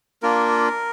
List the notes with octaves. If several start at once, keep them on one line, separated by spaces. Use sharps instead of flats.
A#3 D4 F4 A#4